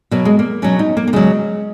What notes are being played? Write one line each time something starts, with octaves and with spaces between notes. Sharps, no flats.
B2 F#3 A#3
G#3
A#3
B2 F#3 C#4
D#4
A#3
A#3
C#3 F#3 G#3